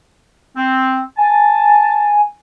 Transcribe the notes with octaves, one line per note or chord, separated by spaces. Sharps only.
C4
G#5 A5